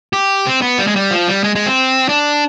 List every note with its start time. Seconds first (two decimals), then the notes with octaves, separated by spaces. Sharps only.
0.13 G4
0.46 C4
0.62 B3
0.79 G3
0.87 G#3
0.96 G3
1.11 F3
1.28 G3
1.44 G#3
1.55 G#3
1.66 C4
2.09 D4